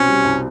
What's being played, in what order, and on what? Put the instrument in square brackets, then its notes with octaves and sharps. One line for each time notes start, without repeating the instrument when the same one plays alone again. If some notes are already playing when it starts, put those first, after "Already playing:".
Already playing: [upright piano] C2 B2 C4 [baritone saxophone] C#4
[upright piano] G3
C2